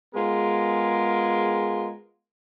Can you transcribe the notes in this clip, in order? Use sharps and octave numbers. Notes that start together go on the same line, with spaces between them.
G#3 B3 F4 G#4 A#4